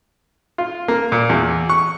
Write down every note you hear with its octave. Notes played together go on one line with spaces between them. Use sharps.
F4
A#3
A#2
E2
C#6